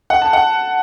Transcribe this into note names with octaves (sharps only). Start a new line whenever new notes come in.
F#5
A5
F#5